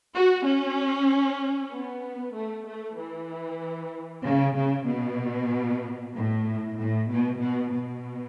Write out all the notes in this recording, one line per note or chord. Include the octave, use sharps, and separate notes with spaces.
F#4
C#4
B3
A3
A3
E3
C#3
C#3
B2
A2
A2
B2
B2
B2